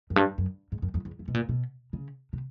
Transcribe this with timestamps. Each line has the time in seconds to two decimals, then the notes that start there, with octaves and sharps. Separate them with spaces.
0.10 F#2
0.16 G2
0.38 F#2
0.72 G#2
0.82 F#2
0.94 F2
1.05 E2
1.19 F2
1.28 B2
1.34 A#2
1.49 B2
1.93 C#3
2.33 C3